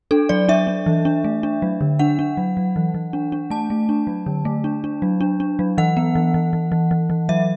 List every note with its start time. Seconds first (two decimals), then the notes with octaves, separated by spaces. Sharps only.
0.11 D4 A4
0.29 F#3 D5
0.49 D4 E5
0.67 D4
0.86 E3
1.05 D4
1.24 A3
1.43 D4
1.62 F#3
1.81 D3
1.99 D4 F#5
2.19 D4
2.37 F#3
2.57 F#3
2.76 E3
2.94 E3
3.13 D4
3.32 D4
3.50 A3 A5
3.70 A3
3.89 D4
4.07 F#3
4.26 D3
4.45 A3
4.64 D4
4.84 D4
5.02 F#3
5.21 D4
5.40 D4
5.59 F#3
5.78 E3 F#5
5.97 B3
6.15 E3
6.34 E3
6.53 E3
6.72 E3
6.91 E3
7.10 E3
7.29 F#3 E5